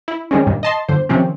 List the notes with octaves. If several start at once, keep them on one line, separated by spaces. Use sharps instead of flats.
E4
D#3 G3 G#3 C4 C#4
G2 A#2 D#3
D#5 A5 C6
G1 D3 C5
C3 D#3 F3 C4 C#4